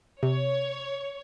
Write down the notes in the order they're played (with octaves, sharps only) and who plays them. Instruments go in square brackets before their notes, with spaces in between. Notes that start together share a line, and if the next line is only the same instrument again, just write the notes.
[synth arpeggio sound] C3 [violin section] C#5